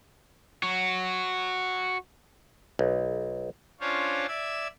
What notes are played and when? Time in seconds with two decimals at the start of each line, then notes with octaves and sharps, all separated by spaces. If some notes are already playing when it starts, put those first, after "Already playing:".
0.63 F#4 C#5
2.79 B1
3.80 C#4 D4 F4 C5 C#5 F5
4.28 D5 E5 E6 G#6